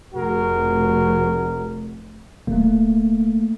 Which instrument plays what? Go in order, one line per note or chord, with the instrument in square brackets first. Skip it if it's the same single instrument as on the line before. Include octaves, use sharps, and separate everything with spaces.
[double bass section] F1 [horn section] F#4 G#4 A#4
[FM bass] D1 [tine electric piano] A3 A#3